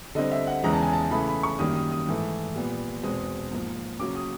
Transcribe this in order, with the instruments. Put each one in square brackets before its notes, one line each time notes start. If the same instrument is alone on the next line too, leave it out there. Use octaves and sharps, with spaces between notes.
[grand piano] D3 G3 C4 D#5
E5
F#5
E2 C#3 E3 G#3 A#5
A5
G#5
A5
C#3 E3 A3 B5
B5
C#6
F#2 D#3 G3 A#3 D#6
D#6
D#6
G#2 E3 A3
A#2 G3 B3
E2 B2 G#3 C4 D#6
G#2 F3 A#3
C#3 F#3 A#3 C#4 D6
D#6